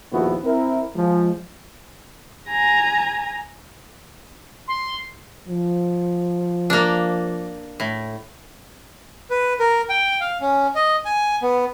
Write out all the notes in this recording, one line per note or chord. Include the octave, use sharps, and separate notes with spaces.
A#1 D#2 F3 B3 E4 F#4
C4 E4 A#4
F3 G#3
G#5 A#5
C6
F3
A#3 D4
A2
B4
A#4
G5
F5
C#4
D#5
G#5
B3